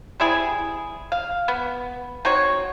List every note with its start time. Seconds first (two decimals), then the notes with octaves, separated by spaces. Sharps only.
0.20 G3 C4 E4 G#4
1.12 F5
1.48 B3
2.25 C4 D#4 F#4 C#5